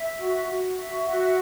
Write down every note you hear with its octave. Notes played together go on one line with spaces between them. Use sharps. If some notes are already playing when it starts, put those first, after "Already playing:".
Already playing: E5
F#4
F#4
E5
F#4